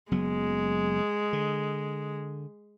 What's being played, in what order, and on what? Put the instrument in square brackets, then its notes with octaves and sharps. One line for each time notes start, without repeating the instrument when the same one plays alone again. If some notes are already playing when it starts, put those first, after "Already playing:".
[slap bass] F#1 F#3 B3 [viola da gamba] G#3
[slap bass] D3